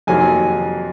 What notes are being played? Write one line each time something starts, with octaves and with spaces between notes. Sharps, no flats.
F2 C3 D#3 F#3 A#3 G#5